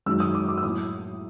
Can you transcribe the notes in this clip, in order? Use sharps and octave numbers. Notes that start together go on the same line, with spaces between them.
F#2 D#3 G#3 E6
D#6
D6
D6
E6
A2 F#3 A#3 D#6